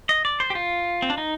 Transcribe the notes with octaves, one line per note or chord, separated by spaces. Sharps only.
D#5
D5
C5
G4
F4
C4
D4
D#4